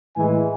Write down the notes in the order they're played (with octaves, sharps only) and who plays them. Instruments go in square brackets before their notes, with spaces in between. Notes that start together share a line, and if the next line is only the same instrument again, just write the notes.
[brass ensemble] A2 E3 G#3 G#5